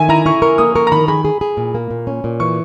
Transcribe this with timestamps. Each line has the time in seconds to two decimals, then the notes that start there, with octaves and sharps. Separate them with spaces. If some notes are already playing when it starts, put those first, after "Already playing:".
Already playing: D#3 E5 G#5
0.09 E4 A#5
0.26 E4 C#6
0.42 A#4 C#6
0.58 A#3 D#6
0.75 A#4 C#6
0.87 A#5
0.92 D#3 B5
1.08 G#4 B5
1.25 G#4
1.41 G#4
1.57 A#2
1.75 A#3
1.91 A#2
2.07 C#4
2.24 A#2
2.40 E3 C#6